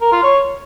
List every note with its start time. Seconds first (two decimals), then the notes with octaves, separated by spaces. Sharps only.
0.01 A#4
0.12 F4
0.23 C#5